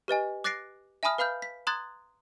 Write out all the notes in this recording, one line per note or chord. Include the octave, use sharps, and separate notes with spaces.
G4 B4 D#5 G#5
D6 F#6 A6 A#6 C7 D7
E5 G#5 A5 B5 D#6 F6
B4 F5 B5 F6 G6
B6
A#5 C6 D#6 F#6 G#6 A6